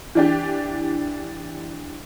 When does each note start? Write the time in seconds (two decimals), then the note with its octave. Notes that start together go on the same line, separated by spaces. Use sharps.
0.15 E3 D4 G4